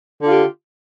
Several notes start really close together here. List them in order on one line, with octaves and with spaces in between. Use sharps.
D3 F4 G4